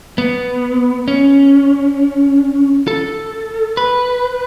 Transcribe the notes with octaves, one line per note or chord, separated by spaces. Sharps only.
B3
C#4
A4
B4